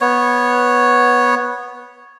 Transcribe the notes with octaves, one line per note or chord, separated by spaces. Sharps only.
B3 C#5